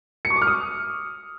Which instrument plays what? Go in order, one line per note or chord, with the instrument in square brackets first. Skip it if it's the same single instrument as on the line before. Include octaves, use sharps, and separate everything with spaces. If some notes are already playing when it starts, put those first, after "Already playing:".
[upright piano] C#7
C#6
D6
F6
D#6